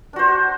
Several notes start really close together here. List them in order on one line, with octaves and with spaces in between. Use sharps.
D4 F#4 C5